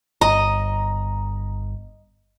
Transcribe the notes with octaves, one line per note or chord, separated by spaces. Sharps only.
G1 D#5 A#5